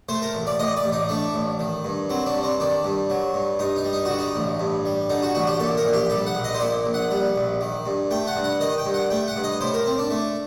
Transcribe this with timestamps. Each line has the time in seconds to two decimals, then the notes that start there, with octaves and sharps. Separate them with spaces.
0.09 A3 C5
0.22 A#4
0.35 A1
0.47 D5
0.59 A2 D#5
0.77 D5
0.84 A1
0.93 D#4
1.09 A3 D4
1.34 A1
1.60 D#3
1.85 G2
2.10 F#3 C4
2.26 D4
2.35 G2
2.43 C4
2.60 D#3 D4
2.84 G2
3.10 F#3
3.34 G2
3.59 G2 D#4
3.76 D#4
3.85 G3
3.93 D#4
4.05 D3 F#4
4.19 D#4
4.35 A1
4.60 G2
4.85 G3
5.10 D3 D#4
5.22 F#4
5.35 A1 F#4
5.47 G4
5.60 A#2 A4
5.77 A#4
5.85 A#1
5.93 G4
6.10 G3 A4
6.27 F#5
6.35 A#1
6.44 D#5
6.54 C5
6.60 A#2 D5
6.86 A#1
6.94 F#5
7.11 G3
7.36 A#1
7.61 D#3
7.86 G2
8.11 A3 G5
8.27 F#5
8.36 G2
8.44 F#5
8.60 D#3 D#5
8.78 G5
8.86 G2
8.94 F#5
9.10 A3 G5
9.28 F#5
9.36 G2
9.44 D#5
9.61 A2 C5
9.74 A#4
9.86 C4
9.98 D4
10.10 A3